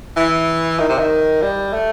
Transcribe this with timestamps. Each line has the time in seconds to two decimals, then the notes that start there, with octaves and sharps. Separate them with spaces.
0.16 E3
0.79 D#3
0.89 C3
0.99 D#3
1.42 G3
1.74 A3